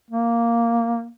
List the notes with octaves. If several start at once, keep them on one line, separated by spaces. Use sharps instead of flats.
A#3